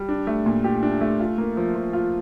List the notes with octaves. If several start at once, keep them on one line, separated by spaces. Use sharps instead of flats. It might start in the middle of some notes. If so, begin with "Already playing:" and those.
Already playing: G3
D4
A3
A#2
G4
D4
A3
F4
A#3
F3
F3
F4